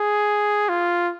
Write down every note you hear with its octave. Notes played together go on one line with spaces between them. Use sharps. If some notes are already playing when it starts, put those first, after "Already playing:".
Already playing: G#4
F4